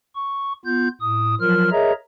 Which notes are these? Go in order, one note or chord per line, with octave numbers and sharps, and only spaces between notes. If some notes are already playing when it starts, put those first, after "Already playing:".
C#6
B3 F4 G6
A2 D#6
F3 F#3 F4 A#4 F6
G#4 A#4 C#5 D#5 E5 A#5